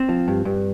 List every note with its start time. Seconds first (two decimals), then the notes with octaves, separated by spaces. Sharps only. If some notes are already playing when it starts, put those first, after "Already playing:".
Already playing: C4
0.09 F3
0.28 G2
0.45 G2